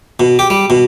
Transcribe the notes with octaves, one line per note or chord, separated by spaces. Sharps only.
B2
G4
G3
B2